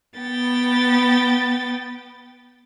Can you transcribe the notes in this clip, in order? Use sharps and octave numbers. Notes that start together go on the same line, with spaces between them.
B3 G5 A6